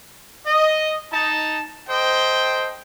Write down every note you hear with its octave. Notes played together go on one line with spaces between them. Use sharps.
D#5
D#4 A5
A4 C5 D#5 G5